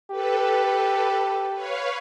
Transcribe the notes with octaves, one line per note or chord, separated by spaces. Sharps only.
G4 A4 B4
B4 C#5 F5